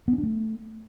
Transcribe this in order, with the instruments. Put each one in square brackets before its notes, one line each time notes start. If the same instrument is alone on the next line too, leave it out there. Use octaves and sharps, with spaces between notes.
[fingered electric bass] B3
C#4
D4
A3